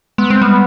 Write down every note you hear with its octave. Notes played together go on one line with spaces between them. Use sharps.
G#3 B3
G#3 C4
G3 B3